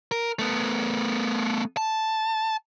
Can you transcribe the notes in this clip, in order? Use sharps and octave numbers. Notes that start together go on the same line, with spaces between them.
A#4
A3 B3
A5